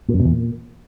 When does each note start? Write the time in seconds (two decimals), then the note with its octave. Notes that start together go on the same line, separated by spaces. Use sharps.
0.09 A#2
0.14 F#2
0.20 B2
0.25 E2
0.31 A#2